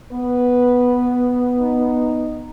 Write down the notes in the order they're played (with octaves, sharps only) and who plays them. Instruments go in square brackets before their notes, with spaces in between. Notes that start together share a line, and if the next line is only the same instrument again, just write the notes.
[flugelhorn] B3 [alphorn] B4
[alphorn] D#4